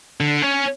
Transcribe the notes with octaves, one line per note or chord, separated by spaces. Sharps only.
D3
C#4